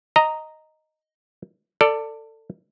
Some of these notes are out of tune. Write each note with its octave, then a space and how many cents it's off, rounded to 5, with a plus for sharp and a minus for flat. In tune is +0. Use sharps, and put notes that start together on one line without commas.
D#5 +0 A#5 -5
A4 +25 D5 +0